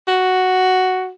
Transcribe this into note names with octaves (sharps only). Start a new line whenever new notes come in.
F#4